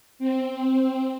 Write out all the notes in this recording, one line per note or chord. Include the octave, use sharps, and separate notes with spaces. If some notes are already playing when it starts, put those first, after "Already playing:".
C4